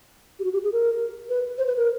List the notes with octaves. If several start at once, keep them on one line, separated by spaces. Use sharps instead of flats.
G4
F#4
G4
G#4
A#4
B4
C5
B4
A#4